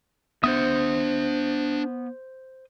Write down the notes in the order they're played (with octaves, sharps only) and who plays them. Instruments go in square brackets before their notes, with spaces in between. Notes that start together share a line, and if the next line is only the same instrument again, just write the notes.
[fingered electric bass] B3 [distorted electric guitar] D4 E5 [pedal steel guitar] C5 D#6